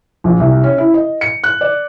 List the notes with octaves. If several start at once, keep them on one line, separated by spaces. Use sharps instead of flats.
A#1
C2
C#4
E4
D#5
C#7
F#6
D5